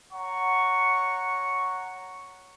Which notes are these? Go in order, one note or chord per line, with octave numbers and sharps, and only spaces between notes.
C#5 F#5 A#5 C#6